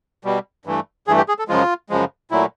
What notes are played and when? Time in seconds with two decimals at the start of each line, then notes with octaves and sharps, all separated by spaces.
0.25 B2 G3
0.65 G2 E3 A3
1.07 G2 E3 A3 G#4
1.17 G4
1.28 G#4
1.39 A4
1.48 F#2 C#3 F3 G#3 F4
1.89 F#2 C#3 F3 G#3
2.31 A#2 F#3 A3 E4